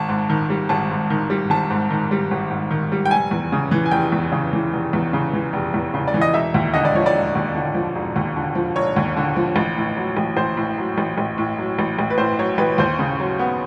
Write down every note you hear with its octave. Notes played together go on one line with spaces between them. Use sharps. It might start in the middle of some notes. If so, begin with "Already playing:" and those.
Already playing: G#1 A5
G#2
D#3
G3
G#1 A5
G#2
D#3
G3
G#1 A5
G#2
D#3
G3
G#1
G#2
D#3
G3
G5
F1 G#5
E2
C#3
E3
G#5
F1 G5
E2
C#3
E3
F1
E2
C#3
E3
F1
E2
C#3
D5
E3
D#5
E1 E5
D#2
D3 D#5
D5
F3 C#5
D5
E1
D#2
D3
F3
E1
D#2
D3
F3
E1 C#5
D#2
D3
F3
A1
A2
F#3
A1
A1 C5
A2
F#3
A1
A1
A2
F#3
A1
A1
B4
A2 C5
F#3 C#5
A1 B4
D#2 C5
C#3
F#3
B3